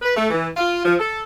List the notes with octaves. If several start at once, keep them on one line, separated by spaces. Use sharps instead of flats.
B4
A3
E3
F4
F3
A4